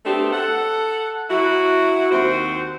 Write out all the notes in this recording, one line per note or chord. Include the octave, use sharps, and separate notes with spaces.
A3 B3 C4 D4 G4
A4 F#5
F#3 E4 F#4
D#2 C4 F#4 C5